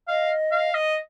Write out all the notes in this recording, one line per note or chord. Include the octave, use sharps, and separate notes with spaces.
D#5 F5
F5
D#5